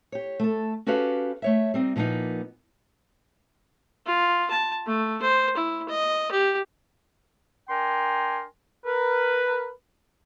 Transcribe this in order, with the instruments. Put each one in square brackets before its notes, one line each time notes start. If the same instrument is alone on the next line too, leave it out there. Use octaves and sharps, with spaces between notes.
[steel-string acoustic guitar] G4 C#5
A3 A4
C#4 F#4 G4 A4 B4 F5
A3 C#5 E5
G3 C4 D#4
A#2 F3 A#3 B3 D#4
[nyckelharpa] F4
A5
A3
C5
E4
D#5
G4
[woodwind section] D4 A#4 G5 G#5 A#5 C6
A#4 B4